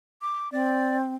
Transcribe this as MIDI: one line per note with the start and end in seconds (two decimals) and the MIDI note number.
0.22 0.51 86
0.52 1.15 60
0.52 0.97 74